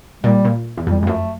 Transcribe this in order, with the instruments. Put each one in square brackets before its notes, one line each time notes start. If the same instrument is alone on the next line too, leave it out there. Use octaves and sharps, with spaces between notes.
[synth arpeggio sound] A#2 [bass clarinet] G3
[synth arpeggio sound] A#2
E2
F2
[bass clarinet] G3
G#3
[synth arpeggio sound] F2
[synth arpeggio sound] F#2 [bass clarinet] A3